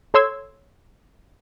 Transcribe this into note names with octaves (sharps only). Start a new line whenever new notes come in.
A4 C#5 C6 E6 G#6